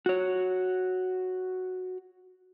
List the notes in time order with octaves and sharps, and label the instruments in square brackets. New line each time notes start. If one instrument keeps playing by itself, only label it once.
[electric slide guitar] F#4 C#5